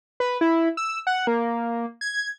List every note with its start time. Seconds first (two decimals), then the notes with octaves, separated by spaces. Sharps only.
0.20 B4
0.41 E4
0.77 E6
1.07 F#5
1.27 A#3
2.01 G#6